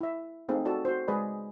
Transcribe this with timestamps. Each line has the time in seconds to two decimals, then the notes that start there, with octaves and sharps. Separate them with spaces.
0.01 E4 E5
0.49 A3 C4 D#4 G#4 F5
0.65 F#4 A4 D5 A5
0.85 F#4 C5
1.08 G#3 G#4 B4 D5 D#5 B5